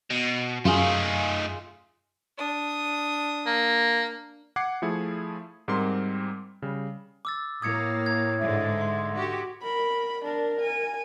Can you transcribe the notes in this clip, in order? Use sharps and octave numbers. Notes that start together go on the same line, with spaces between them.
B2
F#2 A3 D#4 F4 G#4
D4 D#6
A#3
F#5 D6 G#6 C7 C#7
F3 A3 E4 G#4
G#2 G3 C4 A#4 C6
C#3 G3
D6 E6 A6
A2 A#3 D#6 G#6 C#7
G#6
G#2 D3 G#3 E5
C6
F#4 G4
A#4 B5
D4 A#4
G#5